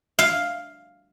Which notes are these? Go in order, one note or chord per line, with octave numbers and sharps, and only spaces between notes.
F5